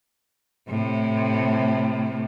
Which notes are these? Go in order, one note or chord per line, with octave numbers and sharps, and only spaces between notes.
A2 C3